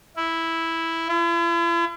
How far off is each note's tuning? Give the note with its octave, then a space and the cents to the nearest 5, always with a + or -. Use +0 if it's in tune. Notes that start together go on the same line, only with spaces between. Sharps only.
E4 -5
E4 +45